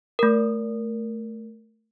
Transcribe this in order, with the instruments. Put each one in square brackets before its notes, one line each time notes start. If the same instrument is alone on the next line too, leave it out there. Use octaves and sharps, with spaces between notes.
[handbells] A3 A#4